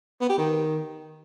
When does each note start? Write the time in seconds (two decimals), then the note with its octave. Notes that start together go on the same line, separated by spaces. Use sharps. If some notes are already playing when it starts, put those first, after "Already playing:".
0.21 B3
0.29 G4
0.38 D#3